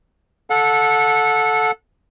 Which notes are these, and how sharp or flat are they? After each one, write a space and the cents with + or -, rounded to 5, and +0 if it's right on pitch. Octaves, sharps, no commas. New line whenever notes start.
A4 -5 F#5 -30